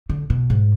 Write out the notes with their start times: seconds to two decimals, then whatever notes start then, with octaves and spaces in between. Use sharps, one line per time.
0.09 D3
0.30 B2
0.50 G#2